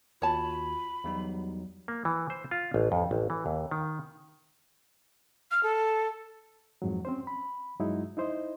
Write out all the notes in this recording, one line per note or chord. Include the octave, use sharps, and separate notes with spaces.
D#2 F4 F#4 C#5 A5 B5
E2 F#3 G3 D#4
A#3
E3
C5
F4
A1
F2
A1
E3
D#2
D#3
F6
A4
F2 G#2 F#3
C4 C#4 C5
B5
G2 F#3 G#3 D#4 E4
D#4 E4 C5 D#5